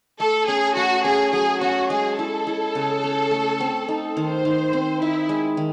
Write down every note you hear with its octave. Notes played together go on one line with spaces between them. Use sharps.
A3 A4
C#4 G#4
A3 F#4
C#4 G#4
F#3 G#4
C#4 F#4
G#3 G#4
E4 A4
E4
C#3
C#4
A3
C4
D#4
D#3 C5
D#3
C4
D#4 E4
G#3
D#3